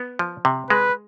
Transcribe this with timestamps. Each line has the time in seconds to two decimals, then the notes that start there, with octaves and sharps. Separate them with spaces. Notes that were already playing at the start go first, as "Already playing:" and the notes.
Already playing: B3
0.19 F3
0.45 C3
0.70 G#3 B4